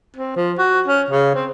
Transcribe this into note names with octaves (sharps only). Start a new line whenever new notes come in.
C4
F3
F#4
C#4
C#3
C4